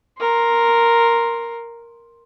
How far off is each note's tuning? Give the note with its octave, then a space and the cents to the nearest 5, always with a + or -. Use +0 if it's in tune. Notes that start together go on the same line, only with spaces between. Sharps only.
A#4 +0 C6 +5